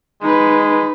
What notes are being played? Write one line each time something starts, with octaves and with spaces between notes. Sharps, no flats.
G#3 D#4 B4